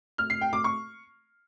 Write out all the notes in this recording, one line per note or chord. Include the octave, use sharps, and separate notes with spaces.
F6
C7
G5
D6
C#6